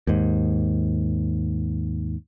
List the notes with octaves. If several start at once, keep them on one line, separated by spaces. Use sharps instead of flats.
D#2 G#2